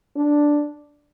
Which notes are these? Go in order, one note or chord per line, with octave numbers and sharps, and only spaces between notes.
D4